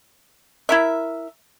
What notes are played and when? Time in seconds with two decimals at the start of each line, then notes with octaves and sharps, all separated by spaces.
0.69 E4 A#4 E5